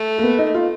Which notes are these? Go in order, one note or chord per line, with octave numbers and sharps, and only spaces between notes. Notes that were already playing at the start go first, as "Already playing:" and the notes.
Already playing: A3
A#3
B3
D#4
F4